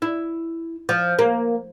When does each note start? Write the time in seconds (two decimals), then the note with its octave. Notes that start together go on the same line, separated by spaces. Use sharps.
0.02 E4
0.89 F3
1.19 A#3